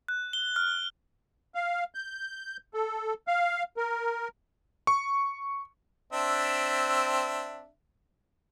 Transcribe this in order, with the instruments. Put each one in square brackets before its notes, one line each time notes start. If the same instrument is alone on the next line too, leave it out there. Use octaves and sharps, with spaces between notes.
[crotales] F#6
G7
F6
[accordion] F5
G6
A4
F5
A#4
[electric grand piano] C#6
[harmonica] C4 D4 E5